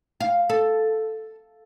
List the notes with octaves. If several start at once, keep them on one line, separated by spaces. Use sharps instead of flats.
F5
A4